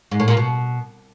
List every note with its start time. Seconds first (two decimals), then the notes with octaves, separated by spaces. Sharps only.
0.11 G#2
0.20 A2
0.28 A#2
0.37 B2